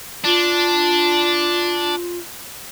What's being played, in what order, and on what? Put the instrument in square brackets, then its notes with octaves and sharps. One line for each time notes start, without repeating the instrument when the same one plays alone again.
[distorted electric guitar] D4 [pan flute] F4